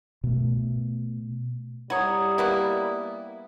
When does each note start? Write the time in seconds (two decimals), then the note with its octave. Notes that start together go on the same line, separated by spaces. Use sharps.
0.24 B2 A3
1.90 G3 E4 C#5 F#5 A#5 D#6
2.38 A#3 B3 E4